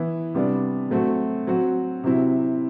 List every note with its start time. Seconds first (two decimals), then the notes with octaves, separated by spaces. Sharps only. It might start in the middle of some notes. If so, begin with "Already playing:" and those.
Already playing: E3 B3 E4
0.34 C3 G3 B3 D4
0.90 F#3 A3 C4 F#4
1.47 F#3 C4 F#4
2.03 C3 F#3 C4 E4